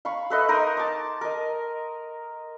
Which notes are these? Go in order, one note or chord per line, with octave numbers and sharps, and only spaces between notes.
F5 B5 C#6
A4 B4 D#5 E5
D#4 A#4 C6 D#6
A5 D6
A#4 D#5